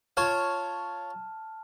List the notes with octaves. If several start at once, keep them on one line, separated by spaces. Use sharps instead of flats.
F4 C#5 A5 F6